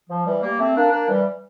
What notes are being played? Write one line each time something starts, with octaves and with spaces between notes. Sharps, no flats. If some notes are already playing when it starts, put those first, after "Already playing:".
F3
E3 G3
G3 A#3
A3 C4
A#3 D4
A#3 D4
E3 G3